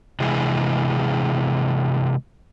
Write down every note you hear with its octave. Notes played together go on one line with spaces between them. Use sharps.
C3 E3 G#3 G#4